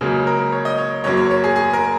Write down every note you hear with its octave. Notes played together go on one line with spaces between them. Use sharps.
C#2 C#3 F#3 A#3 G#4
A#4
C#5
D#5
C#5
F#1 F#2 F#3 A#3 C#5
C#5
C#5
G#4
G#4
A#4